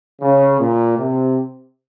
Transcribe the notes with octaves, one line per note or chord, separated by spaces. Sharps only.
C#3
A#2
C3